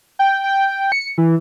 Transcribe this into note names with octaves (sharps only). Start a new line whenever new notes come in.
G5
G5
C#7
E3